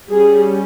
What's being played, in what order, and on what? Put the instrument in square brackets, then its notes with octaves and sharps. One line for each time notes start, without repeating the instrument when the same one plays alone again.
[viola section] G3 C#4 G#4